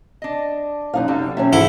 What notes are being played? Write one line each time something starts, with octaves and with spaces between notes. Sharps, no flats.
D4 D#5
F#2 D#4 F5
C3 G3 A4
C3 F#3 C#4 E5
G#2 E4 A4